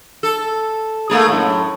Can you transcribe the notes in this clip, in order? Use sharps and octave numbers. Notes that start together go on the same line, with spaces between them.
A4
A3 A#3 G#4
F#2 A2